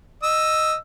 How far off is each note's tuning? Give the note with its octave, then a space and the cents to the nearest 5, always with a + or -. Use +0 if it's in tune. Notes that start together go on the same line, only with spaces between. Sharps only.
D#5 +0 E6 +0